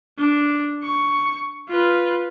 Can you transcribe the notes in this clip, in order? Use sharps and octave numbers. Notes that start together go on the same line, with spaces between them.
D4
C#6
F4 B4